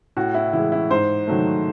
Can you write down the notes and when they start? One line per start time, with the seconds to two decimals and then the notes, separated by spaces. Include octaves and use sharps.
0.17 A2 F#4
0.34 E4
0.53 E3 G#3 E4
0.72 E4
0.90 G#2 C5
1.27 D#3 F#3 A3